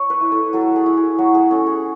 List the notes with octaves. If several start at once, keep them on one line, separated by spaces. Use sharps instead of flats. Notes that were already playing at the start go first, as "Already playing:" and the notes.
Already playing: C#5
B4
E4
A4
F#3 A4
G#4
E4
G#4
F#3 F#4
G#4
C#4 A4
G#4